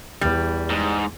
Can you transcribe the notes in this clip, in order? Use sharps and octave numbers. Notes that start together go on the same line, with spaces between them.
E2 G3
G#2